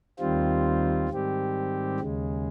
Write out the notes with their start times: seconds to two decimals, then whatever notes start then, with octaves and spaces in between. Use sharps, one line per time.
0.19 D#2 D#3 G3 C4 F4
1.09 G#2 D#3 G3 C4 G4
2.00 D#2 C#3 G#3